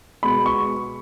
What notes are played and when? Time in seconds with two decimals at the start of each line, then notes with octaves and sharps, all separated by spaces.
0.23 B2 G#3 B3 B5
0.46 C#6